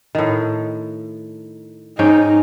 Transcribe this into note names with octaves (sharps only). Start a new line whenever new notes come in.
A2 D#3
G#2 C#4 D#4 G5